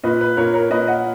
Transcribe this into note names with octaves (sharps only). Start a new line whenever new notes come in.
A#2 B4 D#5
B4
A#2 A#4 C#5
A#4 C#5
A#2 B4 D#5
D#5 F#5